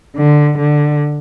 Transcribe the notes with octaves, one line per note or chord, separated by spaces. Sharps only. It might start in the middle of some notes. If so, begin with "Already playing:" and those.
D3
D3